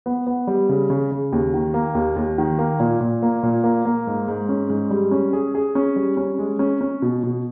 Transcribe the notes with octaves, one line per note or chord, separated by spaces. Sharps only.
B3
B3
G3
C#3
C#3
C#3
D#2
D#3
A#3
D#2
D#2
D#3
A#3
A#2
A#2
A#3
A#2
A#3
A#3
G#2
G#2
C#4
G#2
G3
C#4
G#4
G#4
C#4
G3
C#4
G#3
C#4
C#4
B2
B2